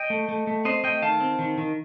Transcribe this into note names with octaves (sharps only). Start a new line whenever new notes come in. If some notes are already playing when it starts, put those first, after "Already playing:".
Already playing: D#5 G5
A3
A3
A3
C4 C5 D#5
A3 D#5 G5
D#3 F5 A5
C4
D#3
D#3